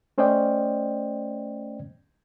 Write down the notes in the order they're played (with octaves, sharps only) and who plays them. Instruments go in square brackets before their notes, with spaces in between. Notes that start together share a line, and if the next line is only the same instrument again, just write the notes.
[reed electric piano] A3 C#4 C5 D5 D#5 G5